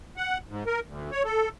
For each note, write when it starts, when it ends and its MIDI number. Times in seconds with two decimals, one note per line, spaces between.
0.17 0.38 78
0.49 0.64 44
0.66 0.80 70
0.87 1.11 38
1.12 1.23 73
1.25 1.49 69